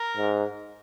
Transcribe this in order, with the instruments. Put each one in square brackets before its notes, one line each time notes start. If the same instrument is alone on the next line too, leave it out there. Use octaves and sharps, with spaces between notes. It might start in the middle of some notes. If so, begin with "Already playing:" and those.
Already playing: [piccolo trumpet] A#4
[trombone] G#2